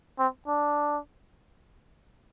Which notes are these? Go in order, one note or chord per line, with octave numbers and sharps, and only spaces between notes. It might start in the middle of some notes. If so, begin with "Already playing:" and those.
C4
D4